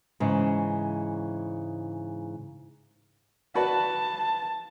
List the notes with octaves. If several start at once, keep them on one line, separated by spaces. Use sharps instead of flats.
G#2 C#3 E3
F#4 B4 D5 A5